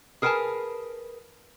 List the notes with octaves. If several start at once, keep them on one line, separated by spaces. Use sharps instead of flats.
G#4 A#4 B4 F#5 G#5 A5